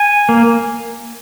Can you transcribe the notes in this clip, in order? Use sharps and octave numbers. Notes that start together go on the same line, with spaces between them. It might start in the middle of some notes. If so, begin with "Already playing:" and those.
Already playing: G#5
A#3